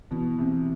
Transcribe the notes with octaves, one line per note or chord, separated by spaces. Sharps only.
B2 E3
C3